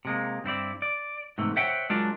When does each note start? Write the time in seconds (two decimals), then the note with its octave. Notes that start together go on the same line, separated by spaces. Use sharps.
0.05 C3 G#3 A#3
0.44 G2 C4 E4 D5
0.82 D5
1.38 G#2 C3 E3 A3
1.56 C5 C#5 E5 F#5 G5
1.90 F#3 G#3 D4 F4 A#4 D5